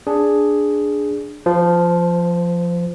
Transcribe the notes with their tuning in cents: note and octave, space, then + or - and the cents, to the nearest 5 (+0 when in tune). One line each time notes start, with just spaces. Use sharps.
D4 +0 G#4 +0
F3 +0 C5 -25